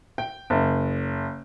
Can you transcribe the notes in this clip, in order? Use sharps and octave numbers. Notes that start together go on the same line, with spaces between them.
G5
F#1